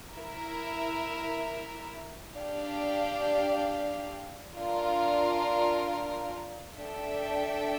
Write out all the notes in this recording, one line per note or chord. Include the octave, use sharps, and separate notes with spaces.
E4 A#4 E5
D4 G4 D5 F5
D4 F4 A#4
D4 A4 E5 G5